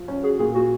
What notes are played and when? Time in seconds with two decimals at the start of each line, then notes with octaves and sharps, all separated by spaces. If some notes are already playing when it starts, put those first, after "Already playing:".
Already playing: F3
0.08 C#4
0.23 F#4 G#4
0.39 A#2 G#4
0.54 A#2 F#4